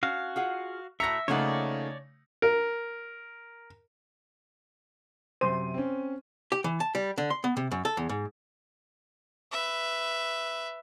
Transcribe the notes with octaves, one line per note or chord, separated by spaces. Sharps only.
C#4 F#4 F5
F4 G#4 F#5
A2 F#4 E5 A#5 A#6 C#7
C#3 F3 A3 A#3 D#4 C#5 D5 F#5
A#4
F#2 C3 C5 D#7
C4 C#4
G4
E3
A5
G3
D3
C6
B3
C3
F#2
A4
E2
G#2
B4 E5